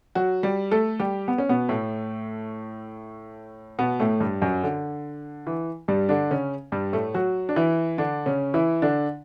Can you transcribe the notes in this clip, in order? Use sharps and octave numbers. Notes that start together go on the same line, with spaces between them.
F#3 F#4
G3 G4
A3 A4
G3 G4
B3
C#4
B2 B3
A2 A3
B2 B3
A2 A3
G2 G3
F#2 F#3
D3
E3
G2 G3
D3 D4
C#3 C#4
G2 G3
A2 A3
F#3 F#4
D4
E3 E4
D3 D4
C#3 C#4
E3 E4
D3 D4